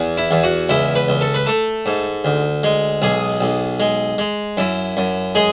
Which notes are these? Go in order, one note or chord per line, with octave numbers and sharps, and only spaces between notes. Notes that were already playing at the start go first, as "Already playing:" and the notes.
Already playing: E2
E4
E2
F#4
C#2 E4
B4
C#2
A4
B4
A3 A4
G#2
D2
G#3
B1 G#4
B1
G#3
G#3
F#2 E4
F#2
G#3 G#4